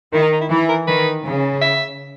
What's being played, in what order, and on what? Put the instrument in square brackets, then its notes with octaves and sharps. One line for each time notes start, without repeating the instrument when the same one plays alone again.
[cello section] D#3 [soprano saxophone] E4
[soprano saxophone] D#4
D#4
E4
[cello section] E3
[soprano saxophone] A#4
[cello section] D#3 [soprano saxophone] B4
[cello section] C#3
[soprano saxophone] E5